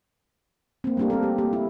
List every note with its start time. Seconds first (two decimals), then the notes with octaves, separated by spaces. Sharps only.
0.84 A#3 C4
0.97 G3 A3 A#3 D4 G4
1.10 C4 A4 A#4
1.23 G4
1.38 A#3 G4
1.53 E4